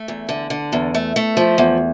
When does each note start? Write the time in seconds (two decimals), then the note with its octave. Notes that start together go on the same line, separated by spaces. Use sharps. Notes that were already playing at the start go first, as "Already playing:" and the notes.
Already playing: A3
0.08 E2
0.29 D3
0.50 D3
0.73 E2
0.94 A3
1.16 A3
1.37 F3
1.58 E2